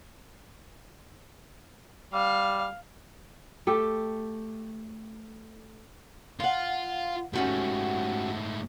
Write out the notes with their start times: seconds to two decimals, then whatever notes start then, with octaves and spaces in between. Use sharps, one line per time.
2.14 G3 F5
3.67 A3 G4 A4
6.40 F4 F5 F#5
7.33 G#2 A3 C#4 F#4 G4